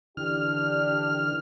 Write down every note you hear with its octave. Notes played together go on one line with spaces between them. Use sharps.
D3 E3 D4 G4 F6